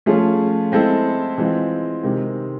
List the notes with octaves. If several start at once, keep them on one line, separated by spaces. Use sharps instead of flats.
F3 A3 C#4 F4 G#4
G#3 C4 E4 A4
E3 G#3 C4 F4
C3 D#3 G#3 C4